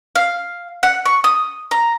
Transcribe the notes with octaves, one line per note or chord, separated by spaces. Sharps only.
F5
F#5
C#6
D#6
A#5